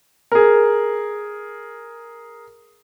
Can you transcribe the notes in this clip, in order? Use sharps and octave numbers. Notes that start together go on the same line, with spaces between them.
G#4 A#4